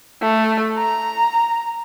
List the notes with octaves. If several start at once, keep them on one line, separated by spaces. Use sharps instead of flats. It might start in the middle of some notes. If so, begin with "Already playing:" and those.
A3
A#5